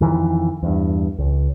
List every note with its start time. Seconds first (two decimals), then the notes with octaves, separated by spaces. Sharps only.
0.01 F2 D#3 E3
0.63 E2 G2
1.18 C#2